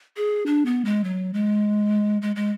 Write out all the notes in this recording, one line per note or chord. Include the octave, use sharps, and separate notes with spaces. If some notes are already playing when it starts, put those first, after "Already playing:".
G#4
D4
B3
G#3
F#3
G#3
G#3
G#3